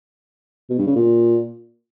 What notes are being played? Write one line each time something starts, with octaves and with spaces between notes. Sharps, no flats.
B2
G2
C#3
A#2